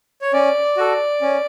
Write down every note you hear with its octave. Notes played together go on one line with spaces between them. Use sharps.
C#5
C#4 D5
F#4 A4
C#4